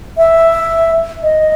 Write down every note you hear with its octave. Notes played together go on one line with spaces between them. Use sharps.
E5
D#5